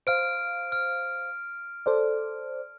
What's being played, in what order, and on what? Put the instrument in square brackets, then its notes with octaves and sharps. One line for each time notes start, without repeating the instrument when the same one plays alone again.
[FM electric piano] C5 F5 [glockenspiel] F6 D7
[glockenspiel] F6
[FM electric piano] A4 C5 D5